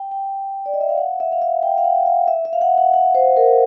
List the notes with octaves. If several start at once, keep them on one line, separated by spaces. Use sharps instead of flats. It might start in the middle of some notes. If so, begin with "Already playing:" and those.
Already playing: G5
G5
D5
D#5
E5
F5
F#5
E5
F5
E5
G5
F5
F#5
F5
E5
E5
F5
F#5
F#5
F#5
C5
A#4